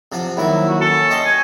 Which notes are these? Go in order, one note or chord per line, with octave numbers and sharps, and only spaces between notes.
C3 F3 F#5
D#2 F#3 E4 C#6
F#4
C#4 A4
D#5 G5 C6
C#4 G#5